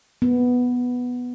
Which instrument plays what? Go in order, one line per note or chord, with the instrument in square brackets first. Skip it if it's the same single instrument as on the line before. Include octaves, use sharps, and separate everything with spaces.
[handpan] B3